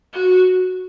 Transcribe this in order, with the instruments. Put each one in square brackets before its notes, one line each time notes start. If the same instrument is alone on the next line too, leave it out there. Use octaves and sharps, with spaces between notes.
[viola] F#4